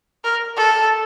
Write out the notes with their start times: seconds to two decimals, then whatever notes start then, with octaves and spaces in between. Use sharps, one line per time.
0.24 A#4
0.57 A4